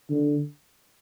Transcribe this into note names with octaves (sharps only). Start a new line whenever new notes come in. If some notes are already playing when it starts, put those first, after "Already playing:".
D3